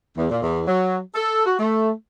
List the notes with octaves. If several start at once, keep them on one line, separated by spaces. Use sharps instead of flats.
E2
A#2
E2
F#3
A4
F#4
A3